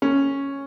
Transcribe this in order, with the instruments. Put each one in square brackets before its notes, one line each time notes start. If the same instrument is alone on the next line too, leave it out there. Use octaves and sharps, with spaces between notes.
[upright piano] C#4